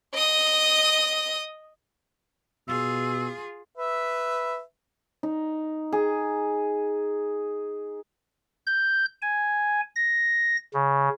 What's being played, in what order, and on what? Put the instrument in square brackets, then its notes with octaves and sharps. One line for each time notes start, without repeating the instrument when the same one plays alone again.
[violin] D#5 D#6
[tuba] B2 [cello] F4 G#4 [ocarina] E6
[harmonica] B4 E5
[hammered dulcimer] D#4
G#4
[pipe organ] G6
G#5
A#6
C#3